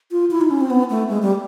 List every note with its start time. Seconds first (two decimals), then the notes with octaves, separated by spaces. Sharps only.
0.11 F4
0.31 E4
0.41 D#4
0.51 C#4
0.61 C4
0.70 B3
0.90 A3
1.09 G#3
1.22 G3